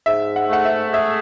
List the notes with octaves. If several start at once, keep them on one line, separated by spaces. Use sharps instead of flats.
G#2 E5
F#5
A3 F#5
E5
G#4 E5